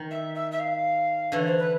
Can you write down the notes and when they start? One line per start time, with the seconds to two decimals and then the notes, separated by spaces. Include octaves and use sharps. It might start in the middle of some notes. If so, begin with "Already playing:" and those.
Already playing: D#3
0.10 E5
0.34 E5
0.51 E5
0.59 F5
1.32 D3 E3 C#5
1.45 C5
1.58 B4